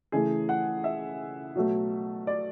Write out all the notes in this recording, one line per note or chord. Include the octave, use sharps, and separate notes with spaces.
C#3 E3 A3 G#4
F#5
E5
B2 F#3 A3
D5